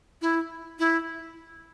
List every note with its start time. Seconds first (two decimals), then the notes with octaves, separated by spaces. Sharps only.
0.22 E4
0.79 E4